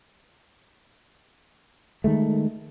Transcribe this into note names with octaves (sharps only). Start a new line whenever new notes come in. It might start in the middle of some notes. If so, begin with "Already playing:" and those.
D#3 G#3 A3